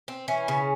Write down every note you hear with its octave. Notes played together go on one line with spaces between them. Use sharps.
C4
E3 C#4
C#3